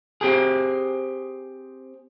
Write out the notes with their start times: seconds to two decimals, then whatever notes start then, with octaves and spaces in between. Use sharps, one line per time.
0.21 C4 G4 G#4